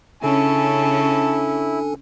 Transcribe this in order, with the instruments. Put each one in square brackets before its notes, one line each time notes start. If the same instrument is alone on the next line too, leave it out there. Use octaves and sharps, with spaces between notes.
[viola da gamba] C#3 C#4 [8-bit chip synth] D4 A4 G#5 [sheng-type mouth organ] E4 [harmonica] A5